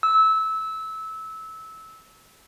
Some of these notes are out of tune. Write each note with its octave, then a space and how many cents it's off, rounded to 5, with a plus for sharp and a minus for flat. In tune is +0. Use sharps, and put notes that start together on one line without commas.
E6 -20